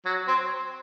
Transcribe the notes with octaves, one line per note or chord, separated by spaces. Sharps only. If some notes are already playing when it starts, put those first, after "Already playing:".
F#3
C4